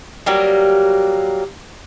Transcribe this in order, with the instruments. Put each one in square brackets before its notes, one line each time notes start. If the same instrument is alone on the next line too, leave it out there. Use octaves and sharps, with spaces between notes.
[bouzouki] F#3 G3 A#3